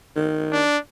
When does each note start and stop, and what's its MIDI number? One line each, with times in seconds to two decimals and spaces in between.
0.16 0.61 51
0.52 0.78 62